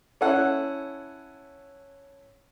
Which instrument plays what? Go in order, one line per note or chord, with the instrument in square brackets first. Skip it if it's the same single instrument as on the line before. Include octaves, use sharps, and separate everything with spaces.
[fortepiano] C#4 E4 A4 F#5